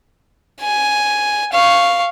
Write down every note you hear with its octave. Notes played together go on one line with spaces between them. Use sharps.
G#5
F5 C#6